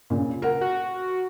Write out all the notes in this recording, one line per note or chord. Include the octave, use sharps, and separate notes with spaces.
A#2 C#3
A#4 F#5
F#4